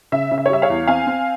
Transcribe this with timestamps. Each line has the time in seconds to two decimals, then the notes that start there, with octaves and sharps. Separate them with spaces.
0.12 C#3 E5
0.31 C#3
0.38 E5
0.46 C#5
0.50 G3 E5
0.62 C#5 F5
0.70 E2
0.87 C4 F5 G#5
1.07 C4